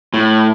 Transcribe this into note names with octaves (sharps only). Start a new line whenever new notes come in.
A2